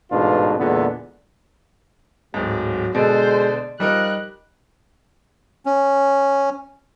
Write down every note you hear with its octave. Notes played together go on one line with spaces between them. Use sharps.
A1 G#2 B2 D4 F4
E2 A#2 D3 G#3 B3
D1 G#2 F#3
B2 D3 G#3 C5 D5
F3 G3 D#4 A#4 F#6
C#4